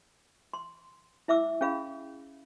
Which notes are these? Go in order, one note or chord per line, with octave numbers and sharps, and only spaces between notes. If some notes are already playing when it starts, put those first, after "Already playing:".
C6
E4 E5 D6 E6
C#4 G#4 F5 B5